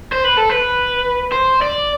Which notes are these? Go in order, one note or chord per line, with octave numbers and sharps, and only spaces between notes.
C5
B4
A4
B4
C5
D5